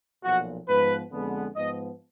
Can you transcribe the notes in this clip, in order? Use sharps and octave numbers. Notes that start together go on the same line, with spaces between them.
B1 A#2 F3 F#4
G#2 F3 B3 B4
F2 D3 G#3 B3
G#2 F3 B3 D#5